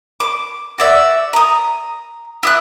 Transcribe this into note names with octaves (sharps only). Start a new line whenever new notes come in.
D6
F#4 D5 E5
A#5 D#6
E4 D#6 F#6